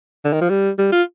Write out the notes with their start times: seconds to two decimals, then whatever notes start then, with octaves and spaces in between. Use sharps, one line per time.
0.25 D3
0.33 D#3
0.41 F3
0.49 G3
0.78 G3
0.92 F4